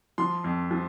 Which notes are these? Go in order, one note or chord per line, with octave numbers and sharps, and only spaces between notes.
F3 C6
F2
F3